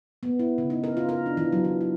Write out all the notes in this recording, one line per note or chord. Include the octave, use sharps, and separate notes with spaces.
B3
E4
C#3
D#4
A#4
F4
A#4
D4
E3
F#3
E3
F4